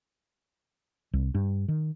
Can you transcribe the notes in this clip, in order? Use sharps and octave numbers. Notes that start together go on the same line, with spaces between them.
C2
G2
D#3